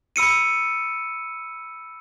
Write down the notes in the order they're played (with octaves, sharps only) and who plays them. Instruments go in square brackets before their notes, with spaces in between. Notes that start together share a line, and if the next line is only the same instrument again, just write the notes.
[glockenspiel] B5 E6 C#7 D#7